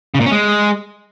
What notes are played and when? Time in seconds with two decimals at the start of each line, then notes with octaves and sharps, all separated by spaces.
0.15 C#3
0.20 A#2
0.26 C#4
0.32 G#3